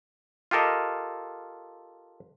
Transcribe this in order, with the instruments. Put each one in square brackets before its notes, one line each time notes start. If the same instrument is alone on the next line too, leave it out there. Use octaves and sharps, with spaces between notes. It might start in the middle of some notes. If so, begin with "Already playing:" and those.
[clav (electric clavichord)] F4 G4 A4 A#4 D#5